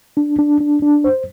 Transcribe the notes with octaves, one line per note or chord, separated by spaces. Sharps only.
D4
D4
D4
D4
C5